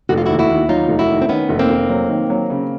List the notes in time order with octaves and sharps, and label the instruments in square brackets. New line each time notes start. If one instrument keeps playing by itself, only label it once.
[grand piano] F1 [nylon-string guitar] F#4
[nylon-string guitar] F4
[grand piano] D#2 [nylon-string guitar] E4 F#4
[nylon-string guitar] E4 F#4
[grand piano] D#2
[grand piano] F#3 [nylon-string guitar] D#4 F4
[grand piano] F1
[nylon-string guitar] E4 F#4
[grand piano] D#3
[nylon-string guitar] C4
[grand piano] D#3 [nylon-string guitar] B3 C#4
[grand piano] F1
[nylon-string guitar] A#3 C4
[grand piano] F1
F#3
D#3
F#3
C#3